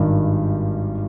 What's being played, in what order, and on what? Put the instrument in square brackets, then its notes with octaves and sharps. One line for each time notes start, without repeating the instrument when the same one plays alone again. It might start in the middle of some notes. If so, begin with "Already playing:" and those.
Already playing: [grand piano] G#1 G2 D#3 G3